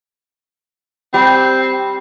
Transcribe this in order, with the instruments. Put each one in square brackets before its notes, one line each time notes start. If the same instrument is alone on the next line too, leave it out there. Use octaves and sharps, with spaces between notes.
[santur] G3 [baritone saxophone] C4